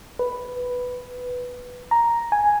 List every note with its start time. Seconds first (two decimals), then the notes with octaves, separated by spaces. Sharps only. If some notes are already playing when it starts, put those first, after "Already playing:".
0.19 B4
1.91 A#5
2.32 G#5